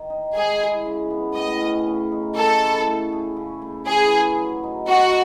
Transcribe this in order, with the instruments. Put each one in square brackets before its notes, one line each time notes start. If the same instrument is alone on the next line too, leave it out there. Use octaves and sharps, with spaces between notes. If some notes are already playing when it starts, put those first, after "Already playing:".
Already playing: [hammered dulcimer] D#3
D#4
[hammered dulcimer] G#3 [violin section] G#4
[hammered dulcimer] E4
C#3
B3
[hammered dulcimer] A2 [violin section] D#5
[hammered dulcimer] C#4
C#3
D#4
[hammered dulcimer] A3 [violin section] A4
[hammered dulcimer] E4
A3
G#4
C#3
A3
[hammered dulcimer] E3 [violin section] G#4
[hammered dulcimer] C#4
F#3
D#4
[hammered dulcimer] B2 [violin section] F#4